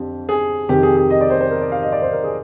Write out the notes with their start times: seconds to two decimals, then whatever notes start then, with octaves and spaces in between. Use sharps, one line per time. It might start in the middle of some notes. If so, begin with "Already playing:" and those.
Already playing: F2 D3 G4
0.29 G#4
0.69 F2 C3 D#3 G4
0.83 G#4
0.97 G#4
1.10 D#5
1.21 D5
1.30 C5
1.41 C5
1.51 A#4
1.61 D5
1.72 F5
1.82 D#5
1.92 D5
2.02 C5
2.12 A#4
2.24 G#4